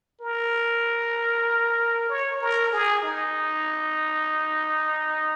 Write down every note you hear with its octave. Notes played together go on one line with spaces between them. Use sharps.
A#4
C#5
A#4
G#4
D#4